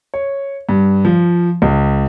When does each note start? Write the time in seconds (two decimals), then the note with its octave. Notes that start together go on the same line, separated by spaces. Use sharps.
0.14 C#5
0.69 G2
1.05 F3
1.62 C#2